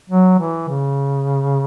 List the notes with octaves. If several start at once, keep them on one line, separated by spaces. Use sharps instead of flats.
F#3
E3
C#3